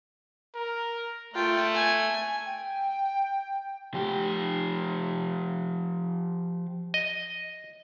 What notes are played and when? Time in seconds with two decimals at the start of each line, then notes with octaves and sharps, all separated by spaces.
0.55 A#4
1.34 A3 F4 G5
1.75 G#5
2.46 G5
3.94 F3 G4
6.94 D#5